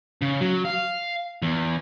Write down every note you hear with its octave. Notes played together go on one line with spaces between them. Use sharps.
C#3
F#3
F5
E2